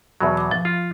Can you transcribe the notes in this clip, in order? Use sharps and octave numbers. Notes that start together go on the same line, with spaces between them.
E2 B2 F#3
B5 D6
F3
F4